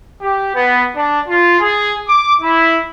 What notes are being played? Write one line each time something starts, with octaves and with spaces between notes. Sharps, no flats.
G4
B3
D4
F4
G#4
D6
E4